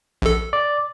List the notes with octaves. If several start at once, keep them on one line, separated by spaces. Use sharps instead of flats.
A#1 A4
D5